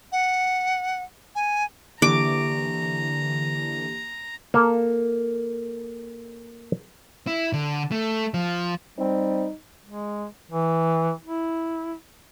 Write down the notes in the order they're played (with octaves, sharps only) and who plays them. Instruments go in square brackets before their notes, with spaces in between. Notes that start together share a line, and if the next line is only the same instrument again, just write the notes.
[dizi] F#5
G#5
[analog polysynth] D3 E3 [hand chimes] A#3 G4 [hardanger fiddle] A#5 [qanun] D6
[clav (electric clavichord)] A#3 A4
[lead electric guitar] E4
D3
A3
F3
[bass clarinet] G3 [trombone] C4 [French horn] D#4
[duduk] G#3
E3
E4